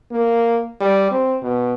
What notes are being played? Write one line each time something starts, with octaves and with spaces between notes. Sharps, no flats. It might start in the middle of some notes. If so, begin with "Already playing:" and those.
A#3
G3
C4
B2